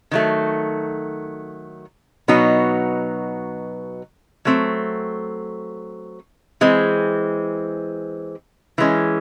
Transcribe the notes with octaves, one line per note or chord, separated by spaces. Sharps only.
D#3 F#3 A3
B2 F#3 B3 D#4
F#3 A3 C4
E3 G#3 C4
E3 G#3 C#4